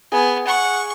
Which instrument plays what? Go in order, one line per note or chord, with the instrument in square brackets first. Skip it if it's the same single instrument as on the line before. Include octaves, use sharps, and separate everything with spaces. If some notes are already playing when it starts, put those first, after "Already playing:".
[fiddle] B3 [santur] G#4
[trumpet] F#5 [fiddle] C#6